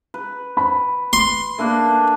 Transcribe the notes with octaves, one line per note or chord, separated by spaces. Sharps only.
B4
B5
C6
A3 A#3 D4 B4